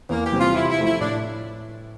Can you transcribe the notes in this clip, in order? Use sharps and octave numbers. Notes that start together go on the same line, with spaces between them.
E2 A#3
G4
C3 G3 C4
F4
C3 E4
E4
F3 A3
E4
A2 D4